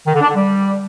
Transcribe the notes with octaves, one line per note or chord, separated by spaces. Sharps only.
D#3
D3
D4
D3
G3